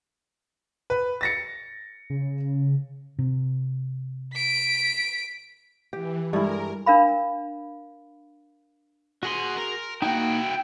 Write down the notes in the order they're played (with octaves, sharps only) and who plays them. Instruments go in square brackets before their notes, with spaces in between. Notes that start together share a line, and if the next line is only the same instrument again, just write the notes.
[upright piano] B4
A6 A#6 C#7
[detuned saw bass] C#3
[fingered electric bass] C3
[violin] B6 D7
[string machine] E3 [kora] G4
[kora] G2 E4 [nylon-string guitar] G3 G#3 A4 [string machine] A#4
[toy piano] D4 A#4 F5 B5
[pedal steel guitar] F#4 G#4 C6 [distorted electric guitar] D#5 F#5
[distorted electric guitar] A#4
[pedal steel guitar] A#3 D#4 [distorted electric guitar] E4 F#4 [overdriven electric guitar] G5